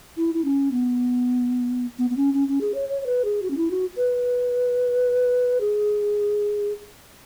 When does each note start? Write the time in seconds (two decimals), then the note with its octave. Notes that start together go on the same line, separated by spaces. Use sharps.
0.17 E4
0.34 E4
0.44 C#4
0.71 B3
1.99 B3
2.10 B3
2.17 C#4
2.34 C#4
2.48 C#4
2.61 G#4
2.74 C#5
2.89 C#5
3.02 C#5
3.06 B4
3.25 G#4
3.42 F#4
3.50 C#4
3.57 E4
3.71 F#4
3.97 B4
5.61 G#4